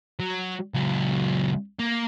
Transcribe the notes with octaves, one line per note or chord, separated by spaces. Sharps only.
F#3
C#2 F#3
A#3